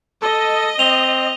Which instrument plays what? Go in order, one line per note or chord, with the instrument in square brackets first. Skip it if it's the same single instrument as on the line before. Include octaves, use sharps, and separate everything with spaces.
[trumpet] A4 [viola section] D#5
[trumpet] C4 [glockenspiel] F7 G7